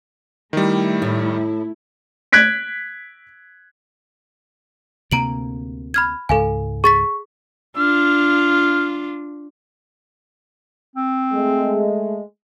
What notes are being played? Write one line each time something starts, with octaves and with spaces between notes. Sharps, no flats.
D#3 G3 A3 E4
A2
F#6 G#6 B6 D7
D2 C3 A#3 A#5 D7 F#7
B5 F6 G#6
C#2 G#2 A4 F5 G#5
G#4 C#6 A6 B6
D4 F4 F6
C4
G#3 A3